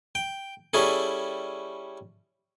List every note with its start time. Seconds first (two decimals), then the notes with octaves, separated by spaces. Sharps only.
0.15 G5
0.74 G3 C#4 E4 G#4 A4